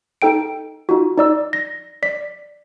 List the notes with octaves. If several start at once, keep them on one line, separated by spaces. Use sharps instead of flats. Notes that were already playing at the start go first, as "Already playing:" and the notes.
D#4 A4 G5 D7
D#4 F4 F#4
D#4 D5 E6
A#6
D5 B6